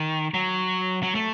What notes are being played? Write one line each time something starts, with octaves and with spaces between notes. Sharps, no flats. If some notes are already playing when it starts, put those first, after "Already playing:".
Already playing: D#3
F#3
F#3
A3